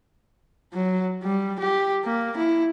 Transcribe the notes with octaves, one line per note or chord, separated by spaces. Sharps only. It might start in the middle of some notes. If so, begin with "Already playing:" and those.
F#3
G3
G4
A#3
E4